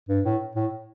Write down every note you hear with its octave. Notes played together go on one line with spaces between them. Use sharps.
G2
A2
A2